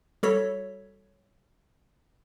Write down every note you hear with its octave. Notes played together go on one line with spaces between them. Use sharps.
G3 F#4 A4 C#5 B6